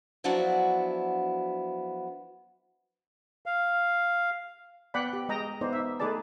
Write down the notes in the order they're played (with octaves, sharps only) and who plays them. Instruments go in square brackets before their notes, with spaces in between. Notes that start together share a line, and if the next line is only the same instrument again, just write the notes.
[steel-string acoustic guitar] F3 F#3 B3 D4 E4 F#4
[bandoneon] F5
[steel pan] B3 D5 F#5 G5 B5
G4
G#3 G#4 D#5 G5 A#5
B3 D#4 C5 D5
D#4 E5
A3 D#4 G#4 B4 D5 A5